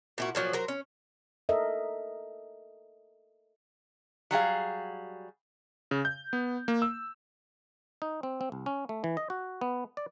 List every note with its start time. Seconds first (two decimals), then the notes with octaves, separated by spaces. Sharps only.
0.18 A#2 E4 F#4
0.35 A#2 F3 F#3
0.53 F#3 A#4 C5
0.68 C#4
1.49 A4 A#4 D#5 E5
4.31 F#3 G3 G#4 F5
5.91 C#3
6.05 G6
6.33 B3
6.68 A#3
6.82 E6
8.02 D#4
8.23 C4
8.41 C4
8.52 C2
8.66 C#4
8.89 A3
9.04 E3
9.17 D#5
9.30 F#4
9.61 B3
9.97 D5